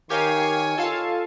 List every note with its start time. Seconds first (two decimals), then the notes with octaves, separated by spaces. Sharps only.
0.10 D#3 G4 A#4 C#5 F5 G#5
0.78 F4 A4 F5 A5